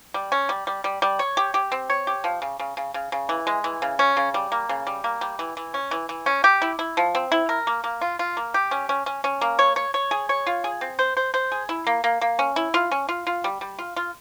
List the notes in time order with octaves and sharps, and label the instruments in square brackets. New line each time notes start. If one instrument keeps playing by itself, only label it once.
[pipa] G3
C#4
G3
G3
G3
G3
C#5
G4
G4
C4
C#5
G4
F3
C#3
C#3
C#3
C#3
C#3
E3
G#3
E3
C#3
C#4
C#3
G3
A#3
C#3
G3
A#3
G3
E3
E3
C#4
E3
E3
C#4
G4
E4
E4
F3
C4
E4
A#4
A#3
A#3
F4
F4
A#3
G4
C#4
C#4
C#4
C#4
A#3
C#5
C#5
C#5
G#4
C#5
F4
G#4
C4
C5
C5
C5
G#4
E4
A#3
A#3
A#3
C#4
E4
F4
C#4
F4
F4
G3
G3
F4
F4